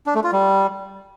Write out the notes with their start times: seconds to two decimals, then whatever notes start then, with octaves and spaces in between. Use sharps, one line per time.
0.06 D4
0.15 A3
0.24 F4
0.32 G3